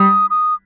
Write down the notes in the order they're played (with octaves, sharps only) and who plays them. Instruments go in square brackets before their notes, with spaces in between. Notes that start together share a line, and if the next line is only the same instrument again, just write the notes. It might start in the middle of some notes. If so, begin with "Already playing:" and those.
Already playing: [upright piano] G3 [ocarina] D#6
[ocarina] D#6